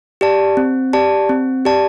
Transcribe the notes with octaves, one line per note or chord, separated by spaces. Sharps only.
G4 D5 A5
C4
G4 D5 A5
C4
G4 D5 A5